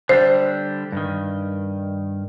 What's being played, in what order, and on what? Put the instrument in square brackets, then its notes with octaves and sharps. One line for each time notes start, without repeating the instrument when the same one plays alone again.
[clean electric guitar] D3 G3 D4 [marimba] C5
[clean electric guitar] G2 D#3